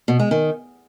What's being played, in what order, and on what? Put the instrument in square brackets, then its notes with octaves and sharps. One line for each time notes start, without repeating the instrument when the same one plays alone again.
[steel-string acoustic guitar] B2
G#3
D#3